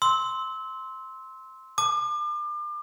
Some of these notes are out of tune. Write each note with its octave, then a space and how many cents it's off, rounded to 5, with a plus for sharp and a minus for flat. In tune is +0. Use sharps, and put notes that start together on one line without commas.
C6 +0 E6 -25
A5 +0 D6 +35